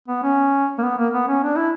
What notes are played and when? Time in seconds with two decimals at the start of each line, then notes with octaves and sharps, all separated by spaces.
0.08 B3
0.23 C#4
0.78 A#3
0.83 B3
0.98 A#3
1.14 B3
1.28 C#4
1.43 D4
1.56 E4